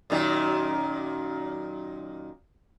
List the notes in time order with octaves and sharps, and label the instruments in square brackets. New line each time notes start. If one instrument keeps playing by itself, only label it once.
[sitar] F#2 A#2 D#3